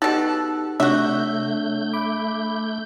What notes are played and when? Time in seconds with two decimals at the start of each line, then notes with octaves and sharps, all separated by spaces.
0.02 B2 D#4 G4 A4 E6 F#6
0.80 C3 A3 D4 F#4 C#5 E5 F#5 G6
1.93 B5 D6